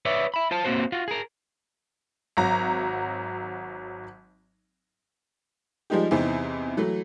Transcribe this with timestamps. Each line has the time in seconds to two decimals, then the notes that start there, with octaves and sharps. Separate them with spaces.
0.05 B4 C#5 D5 E5
0.34 E5 B5
0.51 F4 C5 A5
0.64 A#3 C4 F#4 C5
0.92 F4 F#4
1.08 G#4 A#4
2.37 G#1 F#3 A#5
5.90 F3 G3 G#3 D#4 G4
6.11 E2 C3 E3 C4 D#4
6.77 E3 F#3 A3